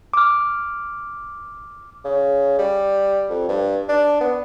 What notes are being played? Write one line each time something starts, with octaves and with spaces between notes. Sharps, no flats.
D6 F6
C#3
G3
F2
G2
D4
B3